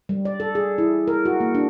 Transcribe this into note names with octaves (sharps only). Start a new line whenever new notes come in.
G3
D5
A4
G#4
E4
A#4
F#4
A#3
D4